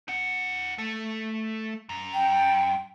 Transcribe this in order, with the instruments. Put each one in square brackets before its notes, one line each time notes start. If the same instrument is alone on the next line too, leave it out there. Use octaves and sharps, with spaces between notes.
[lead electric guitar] D#4 F#5
A3 A4
F#2
[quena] G5